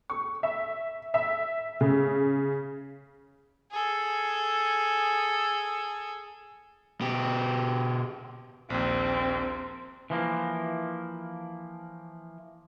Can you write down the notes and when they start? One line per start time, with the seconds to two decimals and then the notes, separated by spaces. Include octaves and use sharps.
0.10 C#6
0.43 E5
1.14 E5
1.81 C#3
3.71 G#4 A4
7.01 B2 G4
8.70 A#1 D#2 C4
10.10 E3 F3 A#3